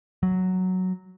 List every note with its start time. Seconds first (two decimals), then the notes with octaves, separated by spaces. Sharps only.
0.23 F#3